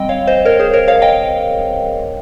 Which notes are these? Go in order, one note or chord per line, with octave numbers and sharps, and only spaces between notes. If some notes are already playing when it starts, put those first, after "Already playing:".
Already playing: G3 C4 D#5 G5
C#5 F5
C5 D#5
A#4 C#5
G#4 C5
A#4 C#5
C#5 F5
D#5 G5